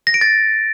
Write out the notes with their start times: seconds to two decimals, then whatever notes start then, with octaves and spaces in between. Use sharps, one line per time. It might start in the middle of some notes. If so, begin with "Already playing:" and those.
0.07 A#6
0.14 D7
0.21 A6